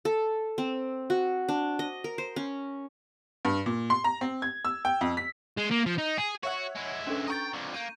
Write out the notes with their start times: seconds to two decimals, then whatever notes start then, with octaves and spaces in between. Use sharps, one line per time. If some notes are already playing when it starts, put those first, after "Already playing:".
0.05 A4
0.58 C4
1.10 F#4
1.49 D4
1.79 D#5
2.04 A#4
2.18 C5
2.36 C#4
3.45 G2
3.66 A#2
3.90 C6
4.04 A#5
4.21 C4
4.42 G#6
4.65 E6
4.85 G5
5.01 F2
5.17 B6
5.57 G#3
5.71 A#3
5.86 F3
5.98 D#4
6.18 G#4
6.43 F#4 C#5 E5 F#5
6.75 G#3 E4
7.07 C#4 D4 A4
7.28 D#5 G5 A#5 C#6 A6
7.54 F2 D3
7.74 A#3 G6 D#7